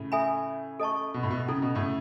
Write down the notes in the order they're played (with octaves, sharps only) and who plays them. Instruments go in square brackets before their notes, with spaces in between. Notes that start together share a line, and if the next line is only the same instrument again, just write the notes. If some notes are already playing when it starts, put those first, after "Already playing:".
Already playing: [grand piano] A2 C#3
[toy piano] A4 E5 G#5 B5
A4 D#5 A5 C#6
[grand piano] B2
A2
B2
[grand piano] C#3 [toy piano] C#4 E4 A4
[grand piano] B2
A2 C#3